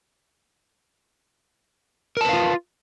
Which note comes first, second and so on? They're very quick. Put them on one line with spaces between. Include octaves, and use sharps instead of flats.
A#4 A5 B4 F5 F4